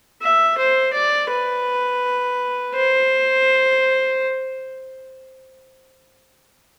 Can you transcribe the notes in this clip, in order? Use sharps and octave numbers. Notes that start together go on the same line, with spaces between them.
E5
C5
D5
B4
C5